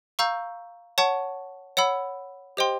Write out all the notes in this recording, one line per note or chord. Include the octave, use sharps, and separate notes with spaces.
F5 A#5 C#6 E6 G6
C#5 F#5 A5 C#6
C#5 F#5 B5 E6
G4 C5 D#5 G5 C6